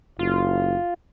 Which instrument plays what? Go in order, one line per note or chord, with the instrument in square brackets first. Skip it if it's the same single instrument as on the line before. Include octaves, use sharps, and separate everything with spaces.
[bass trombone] F#1 [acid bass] F4